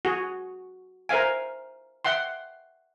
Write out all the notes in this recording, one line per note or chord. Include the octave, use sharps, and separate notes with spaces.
F#4 G#4
A#4 C5 E5 F5 G#5
E5 F#5 G5 C6